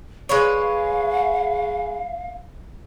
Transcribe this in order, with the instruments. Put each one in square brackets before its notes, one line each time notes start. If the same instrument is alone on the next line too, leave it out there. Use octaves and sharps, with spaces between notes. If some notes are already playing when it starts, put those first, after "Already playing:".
[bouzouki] G#3 B4 C#5 [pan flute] F5